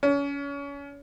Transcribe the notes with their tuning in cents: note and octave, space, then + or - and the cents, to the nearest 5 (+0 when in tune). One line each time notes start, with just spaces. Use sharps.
C#4 +30